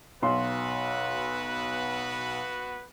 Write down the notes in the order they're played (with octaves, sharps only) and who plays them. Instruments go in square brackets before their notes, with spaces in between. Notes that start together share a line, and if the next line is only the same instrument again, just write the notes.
[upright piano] B1 C6 [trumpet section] B3 F#4 B4